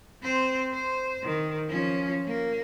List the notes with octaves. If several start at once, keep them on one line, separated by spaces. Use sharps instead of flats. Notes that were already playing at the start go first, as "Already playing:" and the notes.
C4 C5
C5
D#3
F3 C#4
A#3